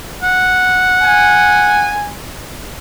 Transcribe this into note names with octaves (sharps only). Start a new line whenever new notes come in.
F#5
G#5